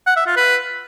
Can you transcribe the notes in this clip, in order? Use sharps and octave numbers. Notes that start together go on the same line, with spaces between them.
F#5
E5
F4
B4